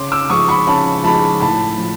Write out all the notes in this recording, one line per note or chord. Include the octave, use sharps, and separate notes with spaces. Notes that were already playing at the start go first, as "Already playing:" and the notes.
Already playing: C#3 C6 D6
D6 E6
F3 G#3 C#6 D#6
B5 C#6
C#3 A5 B5
F3 G#3 A5 B5
A2 A5 B5
F3